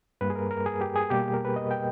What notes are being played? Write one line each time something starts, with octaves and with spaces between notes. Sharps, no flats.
G2 G3 A#3 B4
G#4
A#4
A#4
G#4
G4
G#4
B2 G3 A#3 G4
G#4
A#4
B4
D#5
G5